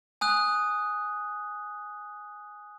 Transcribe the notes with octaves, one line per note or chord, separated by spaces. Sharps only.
G#5 D#6 F#6